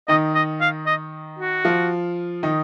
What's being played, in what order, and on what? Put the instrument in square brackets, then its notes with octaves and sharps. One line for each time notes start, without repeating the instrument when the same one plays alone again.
[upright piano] D#3 D#4 [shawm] D#5
[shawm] D#5
F5
D#5
F#4
[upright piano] F3 F4
D#3 D#4